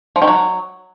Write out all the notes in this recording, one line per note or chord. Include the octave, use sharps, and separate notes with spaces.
F3
D#3
F#3